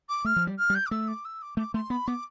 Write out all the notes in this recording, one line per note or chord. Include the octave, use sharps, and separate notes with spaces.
D6
A3 F6
F3
G3
F6
G3
G6
D6
A3 E6
D6
E6
D6
A3 D6
A3 C6
B3 B5
B3 D6